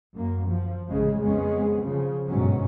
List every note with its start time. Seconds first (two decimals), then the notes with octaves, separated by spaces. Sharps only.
0.16 F#2 A#3
0.49 F3
0.89 A1 C#3 G#3
1.22 F2 G#3 B3 C#4
1.81 C#3 F3
2.27 G1 G#2 B2 F#3 C#4